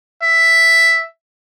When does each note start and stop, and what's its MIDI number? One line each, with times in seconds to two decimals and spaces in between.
0.23 1.06 76